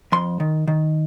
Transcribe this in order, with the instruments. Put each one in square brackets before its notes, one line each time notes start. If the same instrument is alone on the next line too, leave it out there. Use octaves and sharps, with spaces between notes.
[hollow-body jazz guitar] F2 C6
D#3
D#3